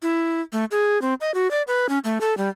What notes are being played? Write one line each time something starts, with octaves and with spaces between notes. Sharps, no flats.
E4
A3
G#4
C4
D#5
F#4
D5
B4
C#4
A3
A4
G3